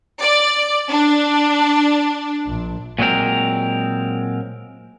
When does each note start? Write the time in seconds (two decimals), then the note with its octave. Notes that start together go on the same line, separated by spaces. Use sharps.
0.21 D5
0.91 D4
2.45 A#1
2.99 A#2 F#3 G#3 C4 A#4